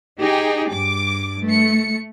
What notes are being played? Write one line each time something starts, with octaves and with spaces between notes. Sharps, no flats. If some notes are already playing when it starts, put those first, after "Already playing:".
D#4 G4 G#4 G5
G2 D6
A3 C#7